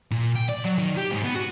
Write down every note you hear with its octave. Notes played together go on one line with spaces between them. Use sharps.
A#2
G5
D5
F#3
D#3
G4
G#2
B3
F#4